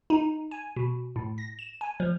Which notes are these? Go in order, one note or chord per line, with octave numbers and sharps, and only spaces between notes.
D#4
G#5
B2
A2
A#6
E7
G#5
F3